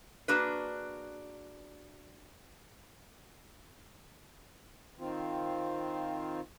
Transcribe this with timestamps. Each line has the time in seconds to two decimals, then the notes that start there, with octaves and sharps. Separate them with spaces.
0.28 A#3 D4 F#4 G#4 B4
4.99 D#3 C4 F4